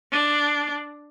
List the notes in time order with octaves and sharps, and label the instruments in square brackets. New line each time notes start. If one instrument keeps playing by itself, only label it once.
[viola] D4